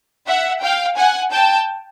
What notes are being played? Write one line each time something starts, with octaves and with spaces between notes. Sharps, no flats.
E5 F#5
F5 G5
F#5 G#5
G5 A5